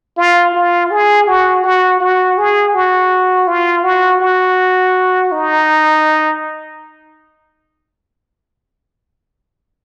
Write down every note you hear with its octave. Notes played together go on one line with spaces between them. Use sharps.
F4
F4
G#4
F#4
F#4
F#4
G#4
F#4
F4
F#4
F#4
D#4